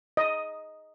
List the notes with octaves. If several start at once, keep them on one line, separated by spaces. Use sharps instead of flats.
D#5